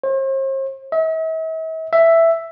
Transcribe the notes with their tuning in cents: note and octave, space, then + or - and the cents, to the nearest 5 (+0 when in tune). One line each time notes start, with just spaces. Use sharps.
C5 +45
E5 -45
E5 +5